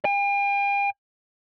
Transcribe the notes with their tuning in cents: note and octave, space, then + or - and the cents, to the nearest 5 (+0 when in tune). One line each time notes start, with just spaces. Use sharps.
G5 +45